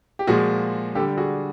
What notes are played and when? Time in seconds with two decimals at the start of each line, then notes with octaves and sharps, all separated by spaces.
0.19 G4
0.27 A#2 F3 G#3 F#4 G#4
0.95 D3 G4 A4
0.99 G3
1.17 F#4 G#4